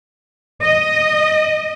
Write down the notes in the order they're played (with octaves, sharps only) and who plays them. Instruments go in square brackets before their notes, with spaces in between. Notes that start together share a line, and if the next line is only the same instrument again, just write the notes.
[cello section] D#5